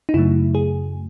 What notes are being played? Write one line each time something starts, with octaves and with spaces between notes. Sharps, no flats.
D#4
F#2 C#3 F#3 A3 E4
G#4